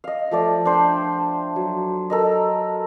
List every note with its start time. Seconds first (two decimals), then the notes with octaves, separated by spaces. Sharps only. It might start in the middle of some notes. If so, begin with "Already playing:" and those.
0.04 D#5 F5
0.31 F3 A3 D5
0.65 D4 C5 G5
1.56 F#3
2.10 A4 A#4 D#5